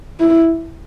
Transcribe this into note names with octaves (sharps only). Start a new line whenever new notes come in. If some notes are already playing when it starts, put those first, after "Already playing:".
E4